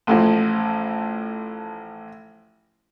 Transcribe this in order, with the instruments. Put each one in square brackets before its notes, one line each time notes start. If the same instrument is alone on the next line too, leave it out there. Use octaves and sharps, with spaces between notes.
[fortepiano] A1 A2 F3